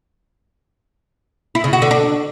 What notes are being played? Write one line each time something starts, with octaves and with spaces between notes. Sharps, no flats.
E4
C#3
F#4
D3
D4